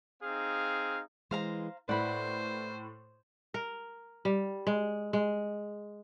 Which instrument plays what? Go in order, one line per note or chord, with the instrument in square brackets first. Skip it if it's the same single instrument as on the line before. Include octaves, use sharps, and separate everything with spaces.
[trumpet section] C4 D#4 G#4 F5
[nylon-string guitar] E3 G#3 [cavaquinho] C5 F5 A#5
[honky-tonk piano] A2 [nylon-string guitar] E4 B4 D5 [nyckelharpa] C5 [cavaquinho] F#5 B5
[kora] A#4
G3
G#3
G#3